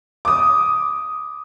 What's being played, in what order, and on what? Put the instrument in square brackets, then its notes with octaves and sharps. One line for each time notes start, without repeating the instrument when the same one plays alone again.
[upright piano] D6 D#6